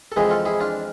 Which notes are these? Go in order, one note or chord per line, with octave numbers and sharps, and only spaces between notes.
A4
F2 E3 G#3 G#4 B4
F4 A4
E4 G#4
D4 F4